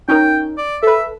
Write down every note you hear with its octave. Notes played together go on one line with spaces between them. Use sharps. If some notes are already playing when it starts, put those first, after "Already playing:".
C#4 D#4 A#4 G5
D5
A4 B4 E5